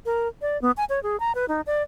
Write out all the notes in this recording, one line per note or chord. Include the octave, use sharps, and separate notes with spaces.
A#4
D5
B3
G#5
C#5
G#4
A#5
B4
D#4
D5